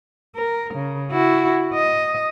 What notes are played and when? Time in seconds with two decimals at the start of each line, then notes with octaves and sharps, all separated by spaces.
0.35 A#4
0.74 C#3
1.11 E4 F#4
1.74 D#5